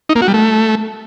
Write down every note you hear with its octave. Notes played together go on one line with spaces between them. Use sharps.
D#4
A#3
F#4
G3
A3